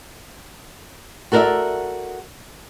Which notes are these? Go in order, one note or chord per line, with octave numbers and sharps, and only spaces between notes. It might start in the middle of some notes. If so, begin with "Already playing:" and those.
F#4 A4 A#4 C5 D5 E5